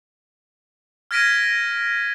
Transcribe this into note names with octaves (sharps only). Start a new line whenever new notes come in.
F6 G#6 A#6 B6 D7 D#7